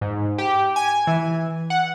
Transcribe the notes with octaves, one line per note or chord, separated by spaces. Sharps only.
G#2
G4
G#5
E3
F#5